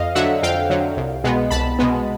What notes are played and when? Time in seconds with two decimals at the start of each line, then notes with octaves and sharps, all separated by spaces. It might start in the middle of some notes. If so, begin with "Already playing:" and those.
Already playing: F2 D#5 F5
0.15 D3 F#3 E5 F#5
0.43 F2 F5 G5
0.70 D3 F#3
0.97 C2
1.24 B2 G#3 B3
1.51 C2 A5 B5
1.79 B2 G#3 B3